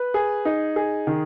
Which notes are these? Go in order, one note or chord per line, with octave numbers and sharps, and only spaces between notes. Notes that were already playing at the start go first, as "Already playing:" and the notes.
Already playing: B4
G#4
D#4
G#4
D#3